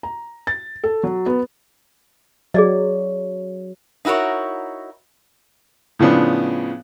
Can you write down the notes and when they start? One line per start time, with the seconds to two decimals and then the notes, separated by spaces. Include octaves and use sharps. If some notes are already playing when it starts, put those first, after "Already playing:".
0.03 A#5
0.47 A6
0.84 A4
1.03 F#3
1.26 B3
2.54 F#3 G#4 D5 D#5
4.05 D#4 E4 F#4 A#4 C#5
5.99 A2 C#3 F3 B3 D4